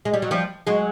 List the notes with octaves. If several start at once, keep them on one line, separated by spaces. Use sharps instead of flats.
G#3
G3
F#3
F3 G3
F#3 G#3